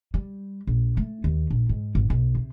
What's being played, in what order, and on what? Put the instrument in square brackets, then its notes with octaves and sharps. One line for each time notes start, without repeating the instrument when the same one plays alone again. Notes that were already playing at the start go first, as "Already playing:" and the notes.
[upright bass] G3
A#1
A3
D#2
A#1
G#2
G#1
B1
C3